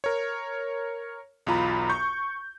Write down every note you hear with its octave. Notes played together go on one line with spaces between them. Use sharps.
A#4 C#5
B1 E2 F4 A#5 B5
C#6 G6